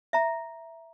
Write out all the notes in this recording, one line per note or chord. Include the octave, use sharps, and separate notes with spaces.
E5 A#5